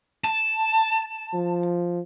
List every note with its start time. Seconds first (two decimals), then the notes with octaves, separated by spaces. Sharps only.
0.24 A5
1.34 F3